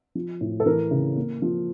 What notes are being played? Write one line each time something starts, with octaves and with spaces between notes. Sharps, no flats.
F3
A2
A4
E3 A#4
C#3
A#3
F3